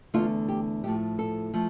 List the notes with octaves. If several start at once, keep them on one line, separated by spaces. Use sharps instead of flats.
E2 D3 A3 F4
G4
A2 F3 A3 G4
A4
F3 A3